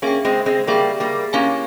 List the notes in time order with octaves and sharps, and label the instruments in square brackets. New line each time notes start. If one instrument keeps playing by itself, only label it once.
[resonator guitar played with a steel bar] A#3 C#4 [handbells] G#4 E5 G5
[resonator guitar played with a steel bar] G#3 C4
G#3 C4
[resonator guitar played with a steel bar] G3 A#3 [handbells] G#4 E5 G5
[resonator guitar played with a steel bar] G3 A#3
[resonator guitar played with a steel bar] A#3 C#4 [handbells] E4 G4 C#5 F5 G#5